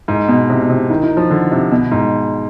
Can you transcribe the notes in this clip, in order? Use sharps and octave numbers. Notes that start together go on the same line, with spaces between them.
G#2
B2
C3
B2
C3
D#3
D#3
F3
D3
C3
B2
G#2